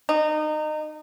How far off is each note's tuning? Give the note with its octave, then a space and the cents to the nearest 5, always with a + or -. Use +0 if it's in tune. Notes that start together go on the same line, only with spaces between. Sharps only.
D#4 -25